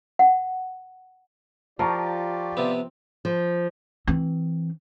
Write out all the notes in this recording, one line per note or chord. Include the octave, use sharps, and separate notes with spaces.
F#5
F3 F4 G4 A#4 D5 A5 A#5 C#6
C3 B3 C4
F3
E3 C4